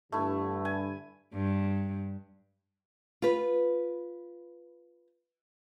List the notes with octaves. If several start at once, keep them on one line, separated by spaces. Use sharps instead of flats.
G2 D3 A3 E4
G#5
G2
F4 B4